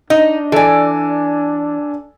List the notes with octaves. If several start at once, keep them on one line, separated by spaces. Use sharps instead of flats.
D4 D#4 D#5
E3 A4 D5 G#5